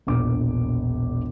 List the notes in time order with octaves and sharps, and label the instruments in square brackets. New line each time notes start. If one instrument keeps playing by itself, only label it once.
[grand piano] E1 A#1 D6